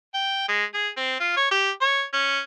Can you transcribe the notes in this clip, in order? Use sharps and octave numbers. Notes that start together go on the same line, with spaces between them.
G5
G#3
G#4
C4
F4
C#5
G4
C#5
C#4